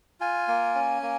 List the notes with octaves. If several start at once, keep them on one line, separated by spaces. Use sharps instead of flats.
F4 G#5
A#3
C#4
A#3